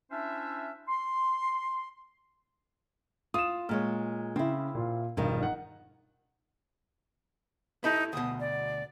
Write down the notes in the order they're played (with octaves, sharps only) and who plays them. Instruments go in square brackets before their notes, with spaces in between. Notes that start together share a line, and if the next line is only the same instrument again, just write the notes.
[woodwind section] C#4 D4 E4 C5 E5
C6
[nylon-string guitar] F4 [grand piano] D#6 E7
[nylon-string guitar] A#2 G#3 C#5 [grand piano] F6
[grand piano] C#3 [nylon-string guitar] C4 E4
[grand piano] A#2 F4
[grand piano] E1 [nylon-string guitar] G2 D#3 F3
[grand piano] D#4 F#5
[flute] D#4 [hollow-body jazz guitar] E4 G4 A4
[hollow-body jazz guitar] D2 B2 [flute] D#6
[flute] D5